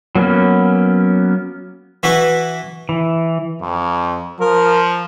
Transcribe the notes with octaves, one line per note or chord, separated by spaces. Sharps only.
F#3 A#3 B3 C#4
E3 E4 F#4 B4
E3
F2
F3 A#4